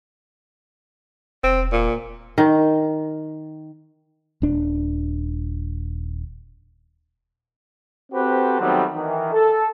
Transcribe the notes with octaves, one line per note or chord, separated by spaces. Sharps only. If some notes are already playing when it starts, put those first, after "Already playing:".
E1 C4
A#2
D#3
D#1 D4
C4 F#4 G4 A4 B4 C5
D#3 F#3 G3 A3 B3 C4
D#3 E3
A4